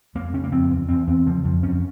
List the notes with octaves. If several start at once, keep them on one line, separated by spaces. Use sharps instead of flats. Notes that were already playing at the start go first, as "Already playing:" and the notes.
F2 A#3
C#3 C#4
A#3
F2 C4
E2
E2 C4
E2 C4
C#3 F3
F2 F3
F2 C#4